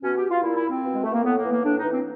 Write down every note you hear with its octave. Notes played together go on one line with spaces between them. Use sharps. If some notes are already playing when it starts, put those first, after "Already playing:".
B2 C#4
G4
F4
A#2 E4
E4
C4
B2
G#3
A3
A#3
A2 B3
A#3
E3
A#3
A2 D4
D#4
E3
C4